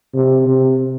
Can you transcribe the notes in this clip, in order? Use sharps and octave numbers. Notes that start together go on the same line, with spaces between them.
C3
C3